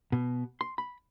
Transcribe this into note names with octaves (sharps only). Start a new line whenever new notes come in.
B2
C6
B5